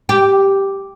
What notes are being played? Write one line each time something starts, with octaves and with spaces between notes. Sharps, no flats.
G4